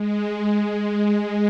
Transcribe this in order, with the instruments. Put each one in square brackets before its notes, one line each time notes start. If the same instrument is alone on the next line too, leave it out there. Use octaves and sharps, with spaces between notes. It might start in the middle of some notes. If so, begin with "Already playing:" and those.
Already playing: [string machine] G#3
G#3